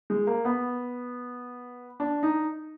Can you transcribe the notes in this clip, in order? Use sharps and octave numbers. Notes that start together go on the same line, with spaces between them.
G#3
A#3
B3
D4
D#4